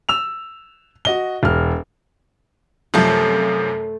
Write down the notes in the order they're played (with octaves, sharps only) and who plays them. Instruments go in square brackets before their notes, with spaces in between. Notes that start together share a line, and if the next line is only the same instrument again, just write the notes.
[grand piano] E6 F7
F#4 D#5 G7
E1 F6
[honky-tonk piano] F#2 C3 F3 [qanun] A3 A4